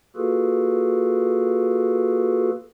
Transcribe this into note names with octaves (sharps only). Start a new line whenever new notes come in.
A#3 F4 F#4 G#4 A4 B4